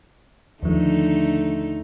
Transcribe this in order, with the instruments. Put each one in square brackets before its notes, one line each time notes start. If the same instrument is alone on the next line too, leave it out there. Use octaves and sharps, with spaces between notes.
[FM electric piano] D#2 F3 [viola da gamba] D3 A3 D#4